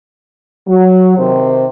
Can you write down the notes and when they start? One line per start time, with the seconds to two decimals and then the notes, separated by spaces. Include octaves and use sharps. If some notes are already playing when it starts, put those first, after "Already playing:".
0.68 F#3
1.18 C3 D#3 C5